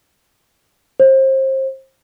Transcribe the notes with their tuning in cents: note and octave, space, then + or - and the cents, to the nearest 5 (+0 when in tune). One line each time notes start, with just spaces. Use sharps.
C5 +30